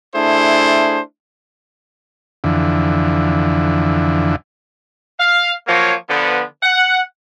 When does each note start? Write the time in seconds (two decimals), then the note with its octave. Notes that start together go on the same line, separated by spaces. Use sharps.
0.16 A3 D4 E4 G#4 C5
2.44 F2 D3 E3
5.20 F5
5.67 F3 F#3 A#3 C#5
6.10 D3 F3 B3
6.63 F#5